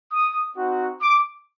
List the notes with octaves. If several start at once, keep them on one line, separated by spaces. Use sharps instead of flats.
D#6
C4 D#4 F#4
D6